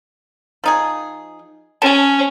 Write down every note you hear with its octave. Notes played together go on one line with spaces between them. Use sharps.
F3 D#4 G#4
C#4 G#5 A5